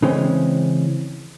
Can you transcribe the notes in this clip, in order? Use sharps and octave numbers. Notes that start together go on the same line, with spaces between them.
C#3 E3 G#3 C4 C#4